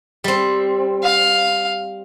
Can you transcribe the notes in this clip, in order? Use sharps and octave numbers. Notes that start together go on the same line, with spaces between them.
G3 C4
F5